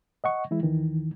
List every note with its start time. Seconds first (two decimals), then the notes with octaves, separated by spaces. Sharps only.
0.24 D#5 F#5 C#6
0.51 E3 G#3 E4
0.63 D#2 D#3 E3